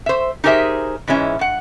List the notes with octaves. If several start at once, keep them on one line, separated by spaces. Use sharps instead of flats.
C5 E5
D#4 G4 G#4 A#4 C5 E5
G#2 E3 G#3 C#4 E5
G2 F#5